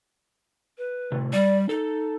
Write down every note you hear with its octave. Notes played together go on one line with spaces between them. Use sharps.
B4
A2 C3
G3 D5
D#4 A4